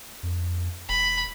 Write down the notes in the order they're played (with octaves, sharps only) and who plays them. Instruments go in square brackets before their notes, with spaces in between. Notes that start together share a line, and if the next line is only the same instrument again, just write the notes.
[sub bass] F2
[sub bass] E1 [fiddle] B5